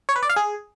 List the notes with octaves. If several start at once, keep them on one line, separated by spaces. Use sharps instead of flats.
C#5
B4
D5
F5
G#4